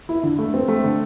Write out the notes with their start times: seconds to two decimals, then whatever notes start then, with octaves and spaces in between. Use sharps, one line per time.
0.09 E4
0.23 D3
0.39 A3
0.54 C4
0.68 A3
0.84 D3